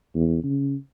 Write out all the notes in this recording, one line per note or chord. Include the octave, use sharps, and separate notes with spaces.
E2
C#3